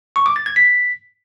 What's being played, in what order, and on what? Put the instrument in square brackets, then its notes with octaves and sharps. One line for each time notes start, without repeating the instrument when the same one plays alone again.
[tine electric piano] C#6
D6
A6
G#6
B6